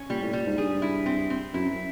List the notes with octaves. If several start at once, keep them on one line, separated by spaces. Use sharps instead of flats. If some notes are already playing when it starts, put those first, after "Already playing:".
Already playing: C#4
A#2 G3
A2
A#2 G3
G#2
G2 G#4
E4
C4
C4
F#2 E4